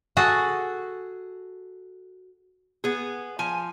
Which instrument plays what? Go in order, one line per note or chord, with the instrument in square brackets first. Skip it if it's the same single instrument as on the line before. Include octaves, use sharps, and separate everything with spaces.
[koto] F#4 G#4 A4
[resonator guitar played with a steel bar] B3 G#4
F3 G#5